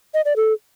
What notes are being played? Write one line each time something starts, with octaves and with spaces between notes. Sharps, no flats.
D#5
D5
A4